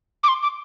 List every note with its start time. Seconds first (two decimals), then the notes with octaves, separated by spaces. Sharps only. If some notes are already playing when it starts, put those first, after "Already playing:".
0.23 D6
0.28 C6
0.42 D6